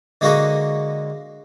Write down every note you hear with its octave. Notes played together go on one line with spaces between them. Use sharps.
D3 G#3 A#3 F#4 A#4